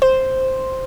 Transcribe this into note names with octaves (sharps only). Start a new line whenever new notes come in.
C5